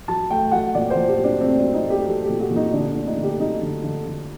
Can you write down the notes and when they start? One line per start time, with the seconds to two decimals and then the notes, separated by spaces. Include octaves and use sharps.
0.08 F#3 A5
0.31 A3 G5
0.51 F#3 F#5
0.75 A#2 D5
0.90 C5
0.96 A#2
1.08 G4
1.19 F#3
1.24 D4
1.40 A3 C4
1.58 D4
1.63 F#3
1.73 D#4
1.84 A3
1.90 G4
2.06 F#3 A4
2.24 G4
2.29 A#2
2.40 F#4
2.51 A#2
2.56 D#4
2.73 D3 D4
2.89 D4
2.94 A3
3.06 D#4
3.17 D3
3.23 G4
3.39 F#3 D#4
3.62 D3
3.84 D3
4.06 D3